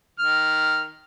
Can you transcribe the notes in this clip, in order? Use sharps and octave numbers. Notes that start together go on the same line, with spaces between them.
D#3 F6